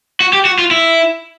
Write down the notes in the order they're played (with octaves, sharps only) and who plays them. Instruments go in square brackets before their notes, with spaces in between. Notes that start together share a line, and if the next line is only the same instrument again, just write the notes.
[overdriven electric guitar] F#4
G4
F#4
F4
E4